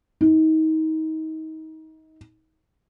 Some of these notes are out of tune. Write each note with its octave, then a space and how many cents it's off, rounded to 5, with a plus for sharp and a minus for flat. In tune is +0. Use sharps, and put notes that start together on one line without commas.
D#4 +30